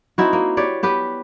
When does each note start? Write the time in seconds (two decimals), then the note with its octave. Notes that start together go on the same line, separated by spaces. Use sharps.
0.18 C4 D#4 E4 F#4
0.33 A#3
0.57 G4 B4 C#5 D5
0.83 B3 G4 B4